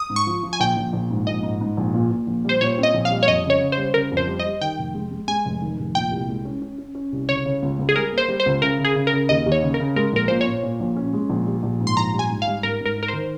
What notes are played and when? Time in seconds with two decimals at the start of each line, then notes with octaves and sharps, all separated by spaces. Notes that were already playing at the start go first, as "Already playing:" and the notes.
Already playing: D#6
0.10 G#2
0.16 C#6
0.27 F3
0.43 F3
0.53 G#5
0.60 A#1 G5
0.77 A#1
0.93 A#1
1.10 G#2
1.27 A#1 D#5
1.43 G#2
1.61 G#2
1.77 A#1
1.94 A#2
2.11 A#2
2.27 A#1
2.45 G3 C5
2.61 A#2 C#5
2.78 C4
2.83 D#5
2.94 A#1
3.05 F5
3.11 G3
3.23 C#5
3.28 F2 D#5
3.45 C#3
3.50 C#5
3.61 C#3
3.72 C5
3.78 G3
3.94 C#3 A#4
4.12 F2
4.17 C5
4.27 G3
4.40 D#5
4.45 G3
4.61 D#3 G5
4.78 F1
4.94 G#3
5.11 G#3
5.28 G#3 G#5
5.45 F1
5.62 D#3
5.79 F1
5.95 A#2 G5
6.11 C2
6.28 G#3
6.45 C#4
6.62 C#4
6.78 C#4
6.95 C#4
7.12 C2
7.29 C#3 C#5
7.45 C#3
7.63 C#2
7.79 C#2
7.89 G#4
7.95 G3 A#4
8.13 A#3
8.18 C5
8.28 G3
8.40 C5
8.46 C#2
8.62 C#3 A#4
8.79 C#3
8.85 G#4
8.96 C#3
9.07 A#4
9.13 C#3
9.29 D#2 D#5
9.46 D#2
9.52 C#5
9.63 C#3
9.74 A#4
9.80 C#3
9.96 G#3 A#4
10.13 A#1 A#4
10.28 A#2 C5
10.41 C#5
10.47 A#2
10.63 A#2
10.80 A#1
10.96 C#4
11.13 G#3
11.30 A#1
11.46 G3
11.63 A#1
11.81 G#2
11.87 C6
11.97 A#1 A#5
12.14 G3
12.19 G#5
12.29 G#2
12.42 F5
12.47 G3
12.63 G#2 A#4
12.80 G#2
12.86 A#4
12.97 D#4
13.03 A#4
13.08 D#3 C5